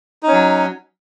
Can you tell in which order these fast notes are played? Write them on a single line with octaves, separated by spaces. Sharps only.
D#4 C#4 F#3